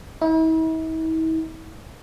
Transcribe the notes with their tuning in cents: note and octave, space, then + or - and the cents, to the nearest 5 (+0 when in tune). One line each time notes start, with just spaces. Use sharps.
E4 -45